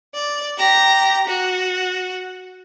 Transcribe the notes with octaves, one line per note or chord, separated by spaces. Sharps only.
D5
G4 A#5
F#4